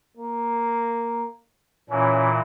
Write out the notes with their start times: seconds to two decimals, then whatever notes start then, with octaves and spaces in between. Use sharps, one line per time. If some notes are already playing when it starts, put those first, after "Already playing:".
0.17 A#3
1.90 A#2 E3 C#4